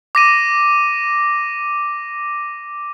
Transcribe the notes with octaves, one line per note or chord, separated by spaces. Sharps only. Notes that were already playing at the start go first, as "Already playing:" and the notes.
D6 A#6 D#7